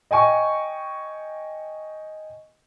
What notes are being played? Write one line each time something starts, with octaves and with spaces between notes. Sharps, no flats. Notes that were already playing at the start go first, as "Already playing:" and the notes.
D#5 G5 G#5 C#6